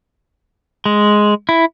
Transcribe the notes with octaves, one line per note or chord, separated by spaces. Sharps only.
G#3
E4